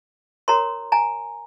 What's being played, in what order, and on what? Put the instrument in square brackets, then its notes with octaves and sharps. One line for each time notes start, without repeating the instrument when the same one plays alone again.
[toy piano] F#4 A#4 C#5 A#5 C6
G#5 A#5